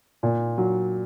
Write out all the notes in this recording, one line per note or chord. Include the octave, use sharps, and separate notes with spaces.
A#2
F#3